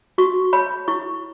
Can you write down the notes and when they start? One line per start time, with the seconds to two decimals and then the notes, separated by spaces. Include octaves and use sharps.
0.18 F#4 C#6
0.53 C#5 B5
0.88 E4 C#6